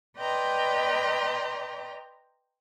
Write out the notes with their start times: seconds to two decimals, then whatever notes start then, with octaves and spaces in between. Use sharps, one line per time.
0.18 B4 D5 D#5 G5 A#5 C6